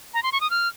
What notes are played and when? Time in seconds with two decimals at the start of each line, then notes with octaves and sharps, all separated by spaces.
0.14 A#5
0.23 C6
0.32 C#6
0.41 D#6
0.50 F6